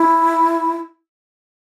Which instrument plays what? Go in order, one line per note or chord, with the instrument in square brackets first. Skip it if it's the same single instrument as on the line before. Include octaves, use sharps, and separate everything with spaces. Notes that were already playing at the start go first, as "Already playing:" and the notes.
Already playing: [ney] E4